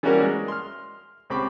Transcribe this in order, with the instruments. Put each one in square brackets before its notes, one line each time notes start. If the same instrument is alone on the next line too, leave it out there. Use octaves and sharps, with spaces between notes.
[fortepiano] E3 G3 A#3 C#4 F#4 A#4
G#3
C6 F6
C#2 C4 G4 B5 C#6 D6